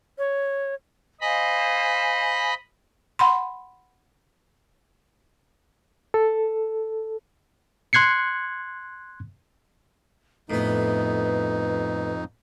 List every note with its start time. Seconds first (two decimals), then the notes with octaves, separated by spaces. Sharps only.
0.19 C#5
1.21 C5 D#5 F5 G#5 B5
3.19 F#5 B5 C6
6.14 A4
7.93 C6 F#6 G#6 C7 C#7
10.50 F2 A2 B3 D#4 B4